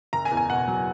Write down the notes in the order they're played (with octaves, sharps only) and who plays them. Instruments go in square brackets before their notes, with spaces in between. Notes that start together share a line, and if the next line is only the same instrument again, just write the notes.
[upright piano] F#1 A#5
G#5
E2
G#5
B2 F#5
F#3